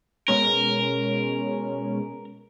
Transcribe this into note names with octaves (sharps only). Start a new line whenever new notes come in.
B2 G#3 C#4 A#4